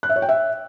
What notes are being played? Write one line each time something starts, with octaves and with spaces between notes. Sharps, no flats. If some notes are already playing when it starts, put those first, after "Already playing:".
F#6
E5
C#5
G5
E5